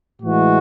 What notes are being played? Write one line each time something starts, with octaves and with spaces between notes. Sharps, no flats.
A2 E3 G#3 F#4